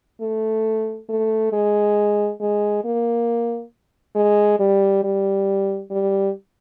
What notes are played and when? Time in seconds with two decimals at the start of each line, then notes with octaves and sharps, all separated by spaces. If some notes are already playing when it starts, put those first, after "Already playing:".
0.21 A3
1.09 A3
1.53 G#3
2.41 G#3
2.84 A#3
4.16 G#3
4.60 G3
5.04 G3
5.91 G3